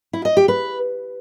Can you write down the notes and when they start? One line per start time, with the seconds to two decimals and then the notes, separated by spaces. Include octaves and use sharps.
0.13 E4
0.25 D#5
0.37 G4
0.48 B4